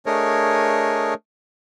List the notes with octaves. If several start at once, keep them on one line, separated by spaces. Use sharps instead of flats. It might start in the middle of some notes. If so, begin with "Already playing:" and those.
A3 D4 G#4 A#4 C#5 D#5